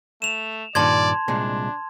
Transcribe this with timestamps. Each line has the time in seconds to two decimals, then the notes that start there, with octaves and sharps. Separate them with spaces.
0.22 A3 E7 F7
0.75 G2 A#2 D#3 D5 A5 C6 G#6
1.28 C2 A#2 G#3 D4